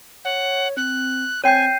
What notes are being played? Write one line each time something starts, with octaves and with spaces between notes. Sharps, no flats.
C#5 F#5
C4 F#6
C4 C#5 G5 G#5 G6 C7 D#7